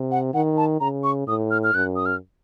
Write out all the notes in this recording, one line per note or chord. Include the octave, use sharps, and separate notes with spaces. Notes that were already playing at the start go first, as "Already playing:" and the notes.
Already playing: C3
F#5
D#3 F#5
A5
C#3 A#5
C#6
A2 D#6
F6
F6
F#2 F#6
D#6
F6